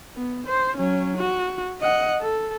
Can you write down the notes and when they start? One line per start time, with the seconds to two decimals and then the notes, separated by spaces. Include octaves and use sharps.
0.15 B3
0.47 C5
0.77 F#3 C#4
1.17 F#4
1.81 D#5 F#5
2.21 A4